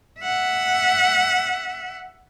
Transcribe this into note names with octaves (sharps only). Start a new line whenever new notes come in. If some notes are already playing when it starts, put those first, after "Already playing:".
E5 F#5